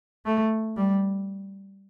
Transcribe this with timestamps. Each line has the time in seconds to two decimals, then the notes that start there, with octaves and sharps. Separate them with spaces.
0.25 A3
0.77 G3